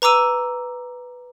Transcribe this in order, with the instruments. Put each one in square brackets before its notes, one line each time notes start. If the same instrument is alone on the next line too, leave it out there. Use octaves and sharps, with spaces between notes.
[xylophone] B4 A#5 D6 E6 D#7